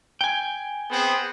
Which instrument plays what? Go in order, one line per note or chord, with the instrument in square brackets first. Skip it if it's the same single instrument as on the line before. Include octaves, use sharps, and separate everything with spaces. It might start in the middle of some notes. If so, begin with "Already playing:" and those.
[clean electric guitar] G5 G#5
[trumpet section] B3 C4 G#4